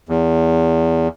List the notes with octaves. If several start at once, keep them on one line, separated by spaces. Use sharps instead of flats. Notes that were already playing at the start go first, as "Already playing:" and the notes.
E2